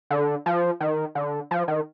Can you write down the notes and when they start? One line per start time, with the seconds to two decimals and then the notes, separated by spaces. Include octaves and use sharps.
0.10 D3
0.46 F3
0.80 D#3
1.15 D3
1.51 F3
1.68 D#3